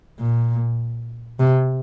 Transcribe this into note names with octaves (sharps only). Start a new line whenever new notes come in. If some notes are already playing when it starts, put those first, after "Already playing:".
A#2
C3